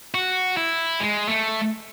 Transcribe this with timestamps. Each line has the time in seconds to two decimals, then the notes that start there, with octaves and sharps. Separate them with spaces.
0.14 F#4
0.57 E4
1.00 G#3
1.29 A3